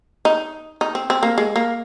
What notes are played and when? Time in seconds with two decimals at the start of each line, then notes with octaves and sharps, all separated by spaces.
0.25 D#4
0.81 D#4
0.95 C4
1.10 C4
1.23 A#3
1.38 G#3
1.56 A#3